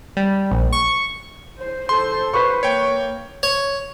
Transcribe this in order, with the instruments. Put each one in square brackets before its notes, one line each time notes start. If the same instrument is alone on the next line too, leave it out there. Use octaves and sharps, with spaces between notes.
[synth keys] G3
A#1
C#6
[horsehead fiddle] C5
[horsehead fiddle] A4 C5 [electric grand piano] C6
[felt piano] B4 C#6 [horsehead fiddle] C5
[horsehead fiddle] A#3 [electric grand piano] C#5 G5
[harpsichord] C#5